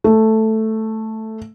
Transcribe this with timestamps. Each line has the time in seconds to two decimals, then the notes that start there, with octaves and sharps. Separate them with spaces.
0.04 A3